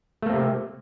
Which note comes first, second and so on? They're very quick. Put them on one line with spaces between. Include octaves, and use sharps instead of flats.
A3 A#3 C4 C3